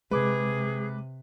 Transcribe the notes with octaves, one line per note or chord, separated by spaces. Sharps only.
C3 G#3 G#4 B4 D6